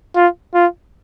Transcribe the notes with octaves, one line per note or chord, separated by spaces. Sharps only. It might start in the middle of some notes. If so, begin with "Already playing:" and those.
F4
F4